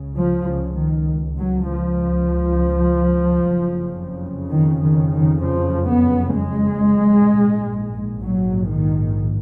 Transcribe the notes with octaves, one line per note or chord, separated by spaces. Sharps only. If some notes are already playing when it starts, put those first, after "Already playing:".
Already playing: C#2 C#3
F3
C#3
D#3
F#3
F3
F#1 F2 C#3
D#3
D#3
D#3
F3
B3
G#3
A#1 G#2
F#3
D#3